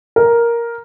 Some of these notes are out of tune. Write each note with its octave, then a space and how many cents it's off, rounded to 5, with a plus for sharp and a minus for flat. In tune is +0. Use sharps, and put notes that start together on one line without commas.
A#4 +5